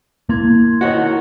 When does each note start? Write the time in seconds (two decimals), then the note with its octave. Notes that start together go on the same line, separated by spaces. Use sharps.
0.29 A#3 E4 C6 G#6
0.81 D#3 E4 F#4 C#5 C#7